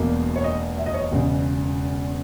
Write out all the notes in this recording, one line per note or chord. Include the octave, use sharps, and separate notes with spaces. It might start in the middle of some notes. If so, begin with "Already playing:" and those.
Already playing: E1 E2 B2 A#3
C#5
D#5
E5
D#5
C#5
D#5
E1 E2 C#3